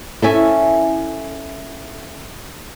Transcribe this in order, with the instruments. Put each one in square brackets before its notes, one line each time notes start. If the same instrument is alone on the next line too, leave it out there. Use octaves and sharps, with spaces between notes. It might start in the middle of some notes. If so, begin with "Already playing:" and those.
[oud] C#4 E4 [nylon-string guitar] A4 E5 G#5